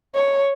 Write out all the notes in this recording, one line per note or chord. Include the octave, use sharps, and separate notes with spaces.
C#5